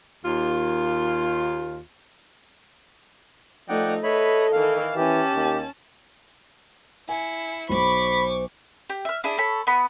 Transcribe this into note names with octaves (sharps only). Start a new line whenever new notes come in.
D#2 F4
F3 A3 D#4 D5 F#5 G5
A4 B4 C#5 D#5 E5 B5
D#3 E3 F5
E3 C#4 G4 A5
D#2
E4 G#5 C#7
B1 C5 B5 C#6 D6
G4
E5 F6
D4 E4 G#4
A4 C#5 B5
B3 B5